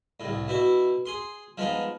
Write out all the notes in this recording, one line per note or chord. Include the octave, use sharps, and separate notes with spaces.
C2 A2
B2 E4
G#4 C6
F3 G#3 B3 D#4